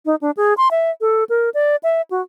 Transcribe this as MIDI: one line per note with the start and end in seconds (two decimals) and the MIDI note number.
0.06 0.15 63
0.21 0.31 62
0.37 0.54 68
0.57 0.68 84
0.71 0.90 76
1.01 1.24 69
1.29 1.49 70
1.54 1.76 74
1.83 2.01 76
2.10 2.21 66